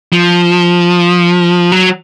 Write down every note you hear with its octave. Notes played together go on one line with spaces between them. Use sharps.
F3
F#3